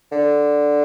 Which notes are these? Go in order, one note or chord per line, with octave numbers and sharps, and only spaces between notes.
D3